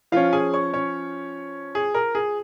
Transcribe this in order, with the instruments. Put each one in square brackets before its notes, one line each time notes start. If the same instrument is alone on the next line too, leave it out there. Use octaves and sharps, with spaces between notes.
[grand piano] F3 C#4 F4 F5
G#4 G#5
C#5 C#6
C#4 C#5
G#4
A#4
G#4